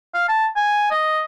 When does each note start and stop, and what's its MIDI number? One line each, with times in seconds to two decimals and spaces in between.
0.14 0.27 77
0.28 0.47 81
0.56 0.88 80
0.91 1.22 75